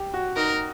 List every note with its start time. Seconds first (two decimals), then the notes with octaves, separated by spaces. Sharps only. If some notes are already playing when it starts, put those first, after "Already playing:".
Already playing: G4
0.14 F#4
0.37 D#4 A#4